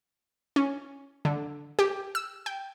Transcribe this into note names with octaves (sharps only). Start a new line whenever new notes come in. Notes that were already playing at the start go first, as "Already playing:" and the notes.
C#4
D3
G4
E6
G5